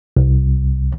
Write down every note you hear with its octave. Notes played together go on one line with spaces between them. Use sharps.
C2